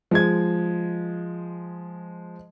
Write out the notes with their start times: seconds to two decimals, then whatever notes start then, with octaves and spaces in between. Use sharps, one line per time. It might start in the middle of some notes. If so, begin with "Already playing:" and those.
0.11 F3 G#3 G#6